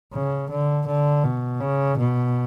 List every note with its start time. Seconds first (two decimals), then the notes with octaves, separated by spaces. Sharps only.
0.13 C#3
0.50 D3
0.87 D3
1.24 B2
1.61 C#3
1.98 B2